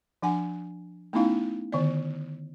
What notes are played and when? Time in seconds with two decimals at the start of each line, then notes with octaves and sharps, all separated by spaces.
0.22 F3 D4 F#5 G#5
1.13 A3 B3 C#4 D#4 E4 F5
1.72 D3 D#3 B3 D5